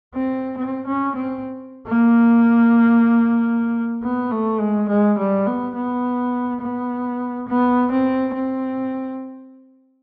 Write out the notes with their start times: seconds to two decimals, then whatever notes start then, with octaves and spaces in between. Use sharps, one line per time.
0.14 C4
0.57 C4
0.86 C#4
1.15 C4
1.87 A#3
4.03 B3
4.31 A3
4.60 G#3
4.88 G#3
5.18 G3
5.46 B3
5.75 B3
6.61 B3
7.48 B3
7.91 C4
8.34 C4